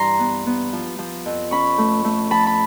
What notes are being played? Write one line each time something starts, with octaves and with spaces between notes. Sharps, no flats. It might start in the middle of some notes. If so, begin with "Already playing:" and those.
Already playing: G2 E3 A#5 C6
B3
B3
F3
F3
F2
C#4 B5 C#6
A3
A3
F3 A5 B5
B5